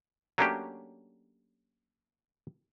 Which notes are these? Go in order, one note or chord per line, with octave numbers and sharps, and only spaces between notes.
F#3 A3 A#3 C#4 D4 G4